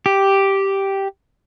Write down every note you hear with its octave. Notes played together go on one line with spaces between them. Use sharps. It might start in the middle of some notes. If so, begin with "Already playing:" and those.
G4